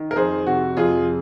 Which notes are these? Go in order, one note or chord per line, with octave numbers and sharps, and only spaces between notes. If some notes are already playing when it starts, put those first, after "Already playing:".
Already playing: D#3
A#4
F2 G#4 C5
C3 F#4
F2 F4 G#4